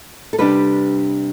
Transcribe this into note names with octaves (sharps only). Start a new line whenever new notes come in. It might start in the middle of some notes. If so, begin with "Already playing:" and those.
A4
C3 G3 D4 B4